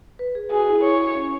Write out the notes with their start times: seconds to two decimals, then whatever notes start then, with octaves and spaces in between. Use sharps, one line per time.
0.19 B4
0.35 G#4
0.51 F#4 G#4
0.68 E4
0.84 E4 C#5
1.15 C#4